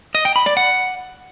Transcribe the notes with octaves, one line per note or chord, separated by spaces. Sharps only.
D#5
G5
B5
D5
F#5